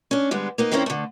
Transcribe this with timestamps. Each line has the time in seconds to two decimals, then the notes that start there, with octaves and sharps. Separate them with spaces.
0.11 C#4 D4
0.31 D3 G3 G#3 B3
0.58 A#3 B3 D#4
0.71 D#3 A#3 C4 C#4 E4 C5
0.86 D3 A3